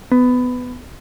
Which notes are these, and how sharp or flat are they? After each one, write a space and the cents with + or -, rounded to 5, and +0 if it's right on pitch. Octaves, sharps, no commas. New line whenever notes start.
B3 +15